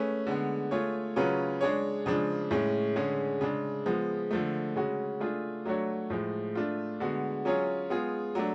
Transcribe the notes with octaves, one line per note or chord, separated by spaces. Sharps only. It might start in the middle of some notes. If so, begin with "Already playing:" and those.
Already playing: A3 C#4 G#4 B4
D3 G#3 B3
A3 F4 G#4 C#5
C#3 F#3 C#4 F4 B4
G#3 D4 G#4 C#5
C#3 F3 G#3 D4
A2 G#3 C#4
D3 G#3 C#4 G#4
C#3 G#3 D4
F3 G#3 B3
D3 F3 A3
C#3 G#3 C#4 F#4
A3 D4 F4 G#4
F#3 A3 D4 F#4 C#5
A2 F3 G#3
A3 D4 F4
D3 G#3 B3 F#4
F#3 C#4 F4 G#4 C#5
G#3 B3 F4 G#4
F#3 A3 D4